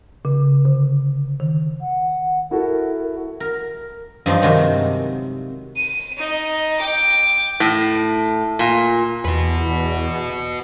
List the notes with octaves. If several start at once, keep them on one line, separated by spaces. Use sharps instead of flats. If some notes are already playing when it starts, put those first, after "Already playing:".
C#3
D3
D#3
F#5
E4 F#4 A4 A#4
A#4
G2 F3 C4 D#4
C3 D#3 F#3 G#3
D#7
D#4 D#5
G5 D6
A2
A#2
E2 F#4 B4